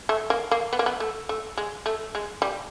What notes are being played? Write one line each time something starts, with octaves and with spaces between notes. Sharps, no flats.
A3
A#3
A#3
B3
A#3
B3
A3
A3
G#3
A3
G#3
G3